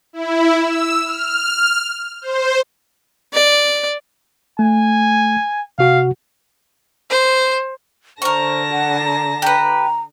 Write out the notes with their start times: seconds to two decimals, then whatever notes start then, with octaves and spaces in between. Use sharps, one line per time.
0.13 E4
0.58 E6
1.04 F6
2.21 C5
3.33 D5
4.59 A3 G#5
5.79 C3 F#4 F5 F#5
7.10 C5
8.22 D3 A#4 C5 A5 C#6 A#6
8.72 F#5
9.03 A#5
9.42 G4 B4 A#5